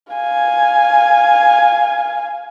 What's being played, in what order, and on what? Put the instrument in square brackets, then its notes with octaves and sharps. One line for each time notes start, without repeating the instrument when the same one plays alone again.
[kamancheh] F5 G#5